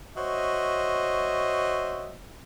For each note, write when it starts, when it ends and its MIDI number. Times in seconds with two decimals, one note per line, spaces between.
0.16 2.14 66
0.16 2.14 72
0.16 2.14 73
0.16 2.14 75
0.16 2.14 76